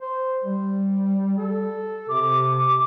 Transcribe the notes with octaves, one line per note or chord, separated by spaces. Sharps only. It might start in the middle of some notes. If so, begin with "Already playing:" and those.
C5
G3
A4
C3 D6